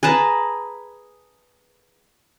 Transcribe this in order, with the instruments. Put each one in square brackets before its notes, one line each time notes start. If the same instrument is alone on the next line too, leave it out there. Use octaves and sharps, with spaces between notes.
[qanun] G#4 B4 A5 A#5